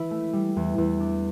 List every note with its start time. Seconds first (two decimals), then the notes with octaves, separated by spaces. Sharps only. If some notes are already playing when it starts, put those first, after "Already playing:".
Already playing: E3 E4
0.11 A3
0.33 G3
0.57 E2
0.78 E2
1.00 D4